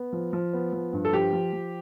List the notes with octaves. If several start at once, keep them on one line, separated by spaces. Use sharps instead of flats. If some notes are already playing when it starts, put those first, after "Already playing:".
Already playing: B3
F3
F3
B3
F3
G2
A4
F3 G4
F3
F3